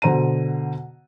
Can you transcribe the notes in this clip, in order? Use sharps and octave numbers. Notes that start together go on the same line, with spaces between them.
B2 D3 C5 A#5 D#7